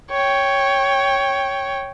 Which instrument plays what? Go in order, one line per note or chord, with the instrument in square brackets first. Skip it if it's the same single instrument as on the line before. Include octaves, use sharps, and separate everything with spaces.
[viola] C#5 G5